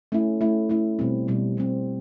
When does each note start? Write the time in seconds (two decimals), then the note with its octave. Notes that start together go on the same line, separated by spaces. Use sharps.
0.12 A3 C#4 E4
0.41 A3 C#4 E4
0.69 A3 C#4 E4
0.99 B2 G3 C4
1.28 B2 G3 C4
1.57 B2 G3 C4